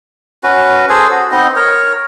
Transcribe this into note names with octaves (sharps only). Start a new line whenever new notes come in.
C#4 F#4 B4
G#4 A4 C5 G#5
F#4
B3 C4 D#4 D#5
A#4 C#5